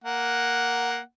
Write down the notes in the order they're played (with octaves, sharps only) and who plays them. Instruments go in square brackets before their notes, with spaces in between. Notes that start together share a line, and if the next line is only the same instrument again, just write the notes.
[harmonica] A#3 F#5